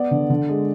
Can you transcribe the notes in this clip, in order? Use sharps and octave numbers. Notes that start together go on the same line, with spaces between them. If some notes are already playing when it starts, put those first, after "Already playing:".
Already playing: B3 D5
D3
D3
G#3